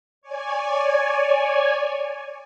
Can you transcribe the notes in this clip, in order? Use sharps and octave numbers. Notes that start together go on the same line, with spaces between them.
C#5 D5 G#5